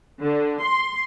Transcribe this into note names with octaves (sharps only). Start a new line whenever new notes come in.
D3
C6